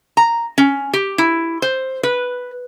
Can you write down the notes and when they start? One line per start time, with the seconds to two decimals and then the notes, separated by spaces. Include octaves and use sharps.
0.17 A#5
0.58 C#4
0.93 G4
1.18 E4
1.62 C5
2.03 B4